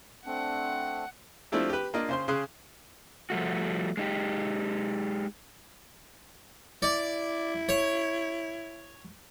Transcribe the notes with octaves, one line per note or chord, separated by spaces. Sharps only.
A3 C4 D4 F#5
F3 A3 C4 D4 E4 G4
G4 B4
A#3 D4 F4 D#5
C#3 C5 C6
C#3 G#4 C6 F#6
F3 G3 A3 F#4
G#3 D#4 G4
E4 D5
C#5